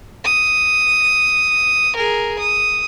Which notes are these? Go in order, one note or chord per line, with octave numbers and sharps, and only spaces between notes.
D#6
G#4 A#4
D#6